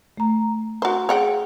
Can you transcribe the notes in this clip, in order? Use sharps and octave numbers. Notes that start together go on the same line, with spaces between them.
A3 A#5
F#4 C5 A#5
G#4 C#5 F#5 G5 A#5